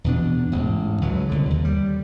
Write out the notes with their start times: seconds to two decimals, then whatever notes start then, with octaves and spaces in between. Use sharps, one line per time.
0.04 E2 B2 D4
0.52 A1 G#2
1.01 C#2 F#3
1.29 C2 D3
1.50 D#2
1.65 G3